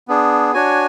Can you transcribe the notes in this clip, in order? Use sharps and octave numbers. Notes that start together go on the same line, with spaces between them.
B3 D4 G#4
D4 F#4 C#5 G#5